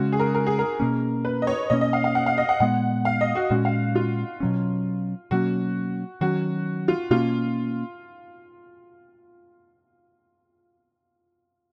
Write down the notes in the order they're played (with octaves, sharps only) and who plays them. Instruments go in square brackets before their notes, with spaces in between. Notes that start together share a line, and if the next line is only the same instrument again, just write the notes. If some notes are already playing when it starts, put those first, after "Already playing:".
Already playing: [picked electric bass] C#3 G#3 C#4 [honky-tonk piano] F#4
[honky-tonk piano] G#4
A#4
A#4
G#4
A#4
[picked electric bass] B2 A#3 C#4
[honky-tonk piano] B4
D#5
C#5
[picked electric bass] B2 A#3 C#4 [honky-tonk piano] D#5
[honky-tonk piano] D#5
F5
F5
F#5
F5
D#5
F#5
[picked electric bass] A#2 G#3 B3 [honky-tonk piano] F#5
[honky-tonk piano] F5
D#5
F#4
[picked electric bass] A#2 G#3 C#4 [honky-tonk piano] F#4
[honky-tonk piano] F5
F4
[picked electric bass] B2 F#3 C#4
[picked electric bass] B2 F#3 A#3 C#4 [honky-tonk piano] F#4
[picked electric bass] D#3 F#3 C#4 [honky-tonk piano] F#4
[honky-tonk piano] F4
[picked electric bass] B2 A#3 C#4 [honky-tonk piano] F4